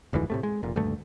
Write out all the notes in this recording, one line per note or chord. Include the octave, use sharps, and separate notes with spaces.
F1 D2 G#2 E3
A2 C3 A3
G#3
F1 A#2
D#1 D2 G2 A3